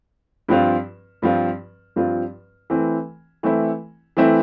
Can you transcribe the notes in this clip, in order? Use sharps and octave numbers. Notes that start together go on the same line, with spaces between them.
G2 F3 C4 F4
G2 F3 C4 F4
G2 F3 C4 F4
E3 A3 C4 E4
E3 A3 C4 E4
E3 A3 C4 E4